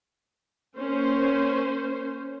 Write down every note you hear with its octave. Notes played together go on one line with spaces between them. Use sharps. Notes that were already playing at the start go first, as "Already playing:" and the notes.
A#3 C#4 C5